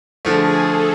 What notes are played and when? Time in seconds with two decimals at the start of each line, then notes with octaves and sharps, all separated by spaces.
0.25 D3 F3 A3 G#4
0.57 A4